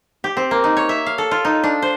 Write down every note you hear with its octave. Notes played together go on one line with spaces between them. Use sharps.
G4
C4
A#3
D#4
C#5
E5
F5
A4
F4
D#4
D4
C5